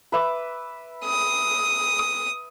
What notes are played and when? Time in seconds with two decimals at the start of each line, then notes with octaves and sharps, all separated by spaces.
0.12 B4 E5 D6
1.05 D#6